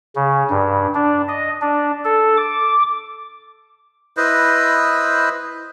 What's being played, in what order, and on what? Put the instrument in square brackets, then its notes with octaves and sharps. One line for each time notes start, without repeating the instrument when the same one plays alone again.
[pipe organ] C#3
G2
D4
D#5
D4
A4
D6
[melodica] E4 B4 C5 D#5